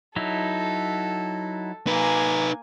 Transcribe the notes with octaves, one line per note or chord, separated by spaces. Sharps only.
F#3 D#4 E4 A4
A#3 D#4 B4 G#5